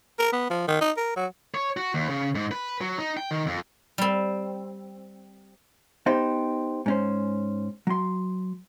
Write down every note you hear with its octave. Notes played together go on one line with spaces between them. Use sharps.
A#4
B3
F3
D#3
D#4
A#4
F#3
C#5
F#4
D#2
C#3
G#2
B4
F#3
D#4
G5
D#3
F2
G3 C4
B3 D#4 G4 C5
G#2 C#4 C5
F#3 C6